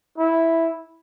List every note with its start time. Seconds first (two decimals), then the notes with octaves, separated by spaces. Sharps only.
0.18 E4